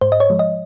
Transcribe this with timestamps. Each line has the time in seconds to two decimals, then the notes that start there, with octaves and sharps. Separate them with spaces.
0.01 G#2 C5
0.12 D#5
0.20 C#5
0.30 F3 G#3
0.39 D#5